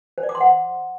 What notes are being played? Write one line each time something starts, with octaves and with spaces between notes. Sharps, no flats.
C5
D5
D6
C6
F#5